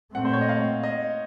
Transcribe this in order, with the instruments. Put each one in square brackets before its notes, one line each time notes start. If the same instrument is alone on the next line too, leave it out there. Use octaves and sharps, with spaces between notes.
[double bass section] A#2 A3 C4 [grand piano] F#5
[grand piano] C5
C#5
D#5
F5
D#5